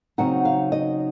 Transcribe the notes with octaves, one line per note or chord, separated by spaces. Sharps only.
C#3 F#3 C4 D#4 F#5
F5
D#5